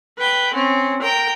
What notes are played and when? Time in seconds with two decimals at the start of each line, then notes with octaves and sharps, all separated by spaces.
0.18 B4 G5
0.54 C4 C#4
1.02 A#4 G5